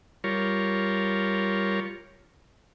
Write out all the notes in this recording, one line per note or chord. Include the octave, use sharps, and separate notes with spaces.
G3 F4 A#4 C#5